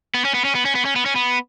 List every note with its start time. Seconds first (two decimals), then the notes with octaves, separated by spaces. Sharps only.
0.14 B3
0.25 C#4
0.35 B3
0.45 C#4
0.55 B3
0.65 C#4
0.75 B3
0.85 C#4
0.96 B3
1.06 C#4
1.16 B3